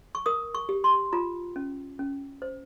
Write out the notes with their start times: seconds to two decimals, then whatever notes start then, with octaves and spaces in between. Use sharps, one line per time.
0.15 C#6
0.26 A#4 D#6
0.55 C#6
0.69 G4
0.84 C6
1.12 F4 A#5
1.56 C#4
1.99 C#4
2.42 C5